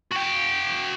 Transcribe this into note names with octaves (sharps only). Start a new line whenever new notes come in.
F#4 G5